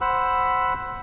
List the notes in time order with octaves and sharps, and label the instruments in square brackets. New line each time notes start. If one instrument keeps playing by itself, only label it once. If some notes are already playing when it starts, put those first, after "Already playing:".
[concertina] C5 F#5 B5 E6